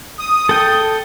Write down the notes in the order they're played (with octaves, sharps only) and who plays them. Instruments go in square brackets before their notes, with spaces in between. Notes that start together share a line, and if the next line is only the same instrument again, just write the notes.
[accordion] D#6
[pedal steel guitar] A4 G5